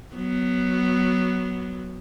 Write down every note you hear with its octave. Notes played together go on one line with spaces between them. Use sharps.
F#3 B3